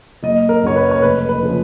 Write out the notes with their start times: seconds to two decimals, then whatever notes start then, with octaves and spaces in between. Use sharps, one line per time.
0.23 F#1 D#5
0.49 A#4
0.63 F#2 C#3 F#3 C#5
0.76 B4
0.91 C#5
1.02 F1 B4
1.29 B4
1.43 C#3 F3